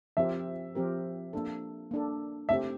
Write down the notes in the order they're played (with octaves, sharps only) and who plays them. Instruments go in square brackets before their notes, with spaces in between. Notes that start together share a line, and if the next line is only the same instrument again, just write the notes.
[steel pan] F3 C4 G4 A#4 [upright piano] E5
[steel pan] F3 C4 G4 A#4
A#3 D4 A4
A#3 D4 A4
[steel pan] A3 C4 G4 [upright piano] E5